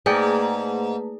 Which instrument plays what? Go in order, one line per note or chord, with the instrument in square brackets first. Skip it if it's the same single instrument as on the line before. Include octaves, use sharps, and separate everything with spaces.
[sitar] G#2 [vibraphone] A3 A#3 B4 [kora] G#4 D5 G5